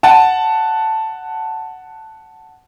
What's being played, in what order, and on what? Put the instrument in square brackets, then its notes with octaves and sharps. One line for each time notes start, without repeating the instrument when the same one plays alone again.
[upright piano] F#5 A5